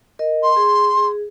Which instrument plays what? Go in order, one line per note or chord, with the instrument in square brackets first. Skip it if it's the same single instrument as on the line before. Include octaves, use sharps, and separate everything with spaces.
[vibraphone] A#4 D#5
[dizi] C6
[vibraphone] G#4
G#4